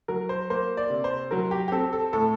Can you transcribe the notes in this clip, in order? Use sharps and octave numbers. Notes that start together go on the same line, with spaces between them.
F#3 A#4
C5
A#3 C5
D5
C3
C5
F#3 A#4
G4
G4
C4 A4
A4
A2 A4